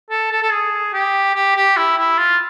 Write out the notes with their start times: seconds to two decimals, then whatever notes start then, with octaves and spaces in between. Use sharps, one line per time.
0.10 A4
0.31 A4
0.42 A4
0.51 G#4
0.93 G4
1.35 G4
1.56 G4
1.77 E4
1.98 E4
2.18 F4